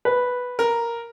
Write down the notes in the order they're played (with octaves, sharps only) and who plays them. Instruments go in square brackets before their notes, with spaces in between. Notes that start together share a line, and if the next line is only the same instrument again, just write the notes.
[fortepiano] B4
[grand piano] A#4